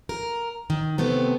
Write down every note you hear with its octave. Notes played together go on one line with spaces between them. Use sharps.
A#4
D#3
C3 A3 B3 C4